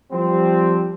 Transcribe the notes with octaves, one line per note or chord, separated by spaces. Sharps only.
F3 G3 C4